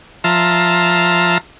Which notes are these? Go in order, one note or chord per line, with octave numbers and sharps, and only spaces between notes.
F3 E5 A5 A#5 C6 F6